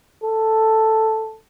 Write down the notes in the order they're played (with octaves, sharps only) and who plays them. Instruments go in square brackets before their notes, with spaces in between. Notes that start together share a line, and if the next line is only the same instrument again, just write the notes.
[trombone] A4